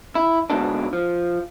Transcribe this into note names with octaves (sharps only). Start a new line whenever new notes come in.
E4
G#2 B2 D3 D4
F3